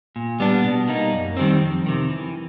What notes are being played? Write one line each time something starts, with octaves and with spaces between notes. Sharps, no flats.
A#2
G3 B3 D4
B2
G3 A#3 D#4
F#2
D#3 G3 C4
F2
C3 D#3
E3